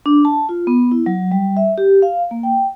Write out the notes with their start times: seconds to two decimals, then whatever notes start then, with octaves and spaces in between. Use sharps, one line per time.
0.06 D4
0.25 A5
0.49 F4
0.67 B3
0.92 E4
1.06 F#3
1.31 G3
1.57 E5
1.78 G4
2.02 F5
2.31 A#3
2.43 G5